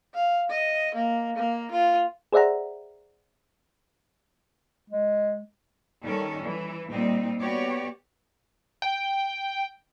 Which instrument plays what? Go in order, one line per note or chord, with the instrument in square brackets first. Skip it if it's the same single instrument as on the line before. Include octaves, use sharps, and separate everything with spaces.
[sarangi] F5
D#5
A#3
A#3
F4
[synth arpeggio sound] G#4 C5 D5 E5 F#5 A#5
[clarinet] G#3
[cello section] D#3 G3 C#4 A4
E3
A#2 G3 C4 D#4
B3 F#4 G4 C#5 D5
[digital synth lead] G5